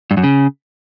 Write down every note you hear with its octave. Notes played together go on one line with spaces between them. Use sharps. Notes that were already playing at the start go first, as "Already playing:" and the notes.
G2
F#2
C#3